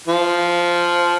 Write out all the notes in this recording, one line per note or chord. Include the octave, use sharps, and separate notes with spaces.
F3